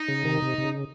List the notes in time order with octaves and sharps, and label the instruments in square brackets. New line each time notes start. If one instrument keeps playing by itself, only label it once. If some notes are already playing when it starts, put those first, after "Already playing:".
Already playing: [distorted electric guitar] D#4
[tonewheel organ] C#3
C3 D#3
C3
C3
C#3